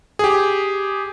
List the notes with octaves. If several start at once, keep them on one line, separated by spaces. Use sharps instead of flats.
G4 G#4